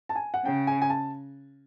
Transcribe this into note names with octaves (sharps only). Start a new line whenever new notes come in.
A5
G#5
F#5
C#3 G5
G#5
G#5
A5